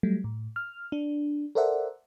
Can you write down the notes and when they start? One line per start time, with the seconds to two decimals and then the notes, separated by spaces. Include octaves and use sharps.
0.03 F#3 G3 A3
0.24 A2
0.56 F6
0.92 D4
1.55 A4 A#4 C5 D5 E5 F#5